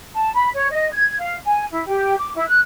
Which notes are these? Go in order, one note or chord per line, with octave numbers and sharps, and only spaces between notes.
A5
B5
C#5
D#5
G#6
F5
G#5
E4
G4
D6
E4
F#6